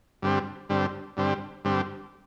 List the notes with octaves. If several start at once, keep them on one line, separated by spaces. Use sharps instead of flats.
G2 D3 G3 C4
G2 D3 G3 C4
G2 D3 G3 C4
G2 D3 G3 C4